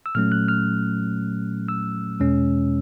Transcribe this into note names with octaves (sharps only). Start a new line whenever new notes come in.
E6
A#2 F#3 A3 C#4 F6
F#6
F6
E6
E2 B2 G#3 C#4